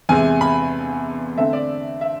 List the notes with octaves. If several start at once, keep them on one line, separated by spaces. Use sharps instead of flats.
E2 C3 G#3 G#5
B5
D3 A3 C4 E5
D5
E5